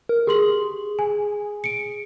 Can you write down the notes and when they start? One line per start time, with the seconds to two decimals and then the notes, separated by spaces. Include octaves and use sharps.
0.09 A#4
0.27 G4 G#4 C6 F#7
0.99 G#5
1.64 C#7 D7